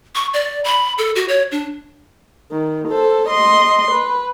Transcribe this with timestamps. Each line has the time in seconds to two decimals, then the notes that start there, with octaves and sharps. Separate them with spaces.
0.15 C#6
0.34 D5
0.64 B5
0.98 A4
1.16 F#4
1.29 C#5
1.52 D4
2.52 D#3
2.88 A4 C5
3.30 D#5 C6
3.92 B4